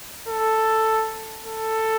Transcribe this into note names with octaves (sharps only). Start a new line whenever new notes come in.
A4
A4